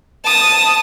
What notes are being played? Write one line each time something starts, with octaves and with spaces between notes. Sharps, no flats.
A5 D#6